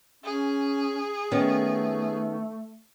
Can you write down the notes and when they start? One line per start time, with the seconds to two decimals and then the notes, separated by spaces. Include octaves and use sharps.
0.24 C#4 G#4
1.31 D#3 A3 B3 C#4